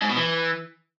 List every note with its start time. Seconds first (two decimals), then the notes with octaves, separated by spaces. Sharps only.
0.02 G#2
0.09 B2
0.17 E3